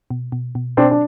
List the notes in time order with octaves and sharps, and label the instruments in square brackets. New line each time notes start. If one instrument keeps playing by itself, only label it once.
[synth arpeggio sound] B2
B2
B2
[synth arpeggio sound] B2 [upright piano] C4 D4
[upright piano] D4